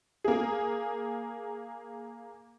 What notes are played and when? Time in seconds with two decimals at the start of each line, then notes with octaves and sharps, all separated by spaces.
0.24 A#3 G#4